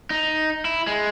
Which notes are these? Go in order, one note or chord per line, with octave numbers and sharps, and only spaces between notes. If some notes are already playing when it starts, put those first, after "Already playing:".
D#4
E4
G#3